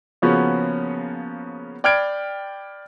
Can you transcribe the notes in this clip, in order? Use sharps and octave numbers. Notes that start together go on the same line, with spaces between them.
C#3 F3 A#3 B3 C#4 F#4
D5 G5 B5 F6 G#6 D7